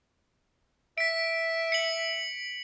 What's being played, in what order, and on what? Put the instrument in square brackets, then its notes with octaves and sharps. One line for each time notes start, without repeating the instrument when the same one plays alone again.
[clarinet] E5 [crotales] B6 D7
[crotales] C#7 F#7